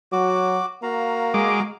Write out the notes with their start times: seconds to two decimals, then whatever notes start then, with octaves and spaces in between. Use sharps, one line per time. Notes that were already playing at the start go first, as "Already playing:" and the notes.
0.12 F#3 F#4 D6
0.83 A#3 F#4 F5 A#5
1.34 G#3 D6